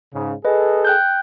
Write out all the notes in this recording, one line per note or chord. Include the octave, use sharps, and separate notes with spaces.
G#2 C#3
G#4 A4 B4 D#5
G5 F#6 G6